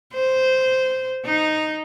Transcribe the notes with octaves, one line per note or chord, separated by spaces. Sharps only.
C5
D#4